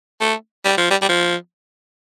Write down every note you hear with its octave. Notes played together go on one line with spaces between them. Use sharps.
A3
G3
F3
G3
G3
F3